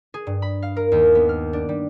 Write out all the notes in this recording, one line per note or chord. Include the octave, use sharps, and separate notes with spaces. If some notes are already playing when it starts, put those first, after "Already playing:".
G#4
G2
B5
F5
A#4
D#2
B3
F6
D4
G3